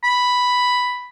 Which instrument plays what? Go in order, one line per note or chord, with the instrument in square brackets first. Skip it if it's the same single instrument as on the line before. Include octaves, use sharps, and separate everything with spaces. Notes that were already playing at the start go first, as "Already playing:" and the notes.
[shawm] B5